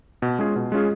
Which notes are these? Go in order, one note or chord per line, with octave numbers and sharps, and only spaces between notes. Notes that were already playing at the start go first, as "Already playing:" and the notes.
B2
G#3 C#4 F4 G#4
B2
G#3 C#4 F4 G#4